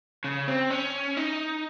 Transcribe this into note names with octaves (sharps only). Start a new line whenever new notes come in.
C#3
C4
C#4
D#4